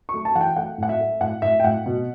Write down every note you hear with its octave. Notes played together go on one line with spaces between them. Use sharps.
A3 C#6
A5
E3 F#5
G5
A3 F#5
A2 F#5
E5
A3
A2 F#5
A2 E5
G5
A2 F#5
B2